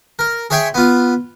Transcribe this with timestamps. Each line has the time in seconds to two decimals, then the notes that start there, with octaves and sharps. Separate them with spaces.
0.19 A#4
0.50 G#4 C#5 E5 G5 C6 C#6
0.74 B3 F4